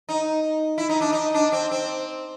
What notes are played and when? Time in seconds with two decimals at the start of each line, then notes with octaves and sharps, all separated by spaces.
0.09 D#4
0.78 E4
0.89 D#4
1.01 D4
1.13 D#4
1.34 D4
1.52 C4
1.72 C4